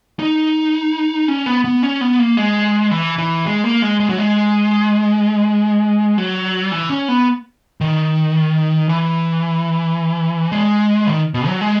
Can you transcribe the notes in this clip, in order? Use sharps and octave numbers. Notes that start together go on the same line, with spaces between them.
D#4
C#4
B3
B3
C#4
B3
A#3
G#3
E3
E3
G#3
A#3
G#3
G#3
F#3
G#3
F#3
E3
C#4
B3
D#3
E3
G#3
D#3
B2
F#3
G#3